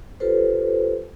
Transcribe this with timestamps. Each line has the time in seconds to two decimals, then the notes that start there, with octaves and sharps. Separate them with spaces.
0.20 F4 G4 A4 B4 C5